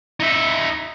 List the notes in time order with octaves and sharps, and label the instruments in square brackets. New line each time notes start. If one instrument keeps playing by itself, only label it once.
[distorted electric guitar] D#4 E5